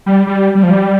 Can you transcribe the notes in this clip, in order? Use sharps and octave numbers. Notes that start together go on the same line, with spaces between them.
G3
G3
G3
F3
G3